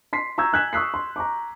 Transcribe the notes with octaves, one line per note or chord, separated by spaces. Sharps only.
C6 B6 C7
A#5 C#6 E6 G6 G#6
G#5 F#6 G#6 B6 E7
C#6 D#6 E6 F#6 B6 C7
C6
A#5 C#6 D6